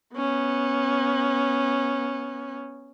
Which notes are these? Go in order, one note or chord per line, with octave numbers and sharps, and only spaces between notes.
B3 C#4